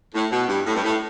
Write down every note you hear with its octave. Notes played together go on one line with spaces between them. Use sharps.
A2
B2
G2
A2
G2
A2